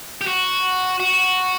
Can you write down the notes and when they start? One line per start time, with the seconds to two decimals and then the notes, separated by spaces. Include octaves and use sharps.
0.21 G4
0.27 F#4
1.00 F#4